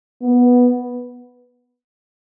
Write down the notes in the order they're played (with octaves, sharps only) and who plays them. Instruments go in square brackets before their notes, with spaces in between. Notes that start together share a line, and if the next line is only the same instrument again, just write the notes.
[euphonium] B3